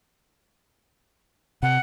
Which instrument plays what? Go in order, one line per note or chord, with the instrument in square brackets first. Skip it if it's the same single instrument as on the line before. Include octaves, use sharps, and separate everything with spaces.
[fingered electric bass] C3 [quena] F#5